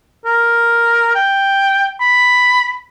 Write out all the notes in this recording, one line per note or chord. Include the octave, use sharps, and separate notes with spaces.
A#4
G5
B5